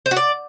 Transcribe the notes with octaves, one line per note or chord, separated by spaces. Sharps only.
C5
F#4
D5